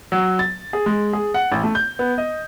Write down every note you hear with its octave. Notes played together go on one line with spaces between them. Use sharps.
F#3
A6
G#4
G#3
G#4
F#5
A1
A3
G6
B3
D#5